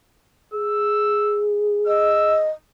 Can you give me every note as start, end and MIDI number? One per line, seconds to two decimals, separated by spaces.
0.54 2.48 68
0.54 1.42 88
1.87 2.49 75
1.87 2.38 88